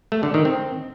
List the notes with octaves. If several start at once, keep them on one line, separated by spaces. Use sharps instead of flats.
A3
D3
D#3
C4